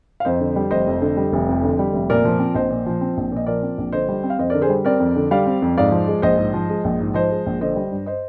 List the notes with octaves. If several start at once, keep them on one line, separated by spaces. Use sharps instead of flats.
F5
F2 C5 D#5
D3
G3
F1 C5 D#5
F2
D3
G3
F1
F2
D3
G3
F1
A#2 A#4 D5
F3
C4
A#1 C5 D#5
A#2
F3
C4
A#1
A#2 D#5
F3 A#4 D5
C4
A#1
D3 C5 D#5
G3
C4
F5
F2 C5 D#5
D3 A#4 D5
G#4 C5
G3
C4 A#4 D5
F2
D3
G3 D5 F5
C4
F2
G#2 D5 F5
F3
G#3
A#1 C5 D#5
G#2
F3
G#3
A#1
G#2
F3 C5 D#5
G#3
A#1
D3 C5 D#5
G3
G2
C5 D#5